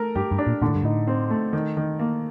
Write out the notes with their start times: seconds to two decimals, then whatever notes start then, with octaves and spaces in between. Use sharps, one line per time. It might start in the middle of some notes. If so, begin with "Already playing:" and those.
Already playing: A3 A#4
0.15 G2 G4
0.31 G2
0.38 D4
0.47 A#2
0.62 A#2 D3
0.68 A2
0.75 G2
0.83 A2 D#4
1.07 C4
1.30 A3
1.53 D#3
1.77 D#3
1.99 A#3